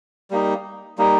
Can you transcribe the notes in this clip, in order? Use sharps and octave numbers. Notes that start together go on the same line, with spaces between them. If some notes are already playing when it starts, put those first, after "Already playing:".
G3 A#3 D#4
G3 A#3 D#4